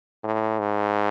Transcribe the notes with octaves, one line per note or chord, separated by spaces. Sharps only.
A2
G#2